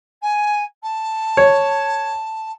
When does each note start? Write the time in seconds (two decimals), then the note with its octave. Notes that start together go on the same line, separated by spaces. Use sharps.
0.22 G#5
0.83 A5
1.37 C#5